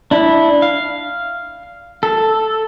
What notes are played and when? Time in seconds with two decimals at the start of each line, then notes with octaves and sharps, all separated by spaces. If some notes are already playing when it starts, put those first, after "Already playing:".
0.11 D4 E4
0.62 F5
2.03 A4